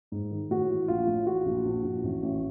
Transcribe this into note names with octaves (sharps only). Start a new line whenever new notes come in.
G#2
D#3
A2 F#4
E3
A#1 F4
A2
E3 F#4
A#1
A#1
A#1
A1
A1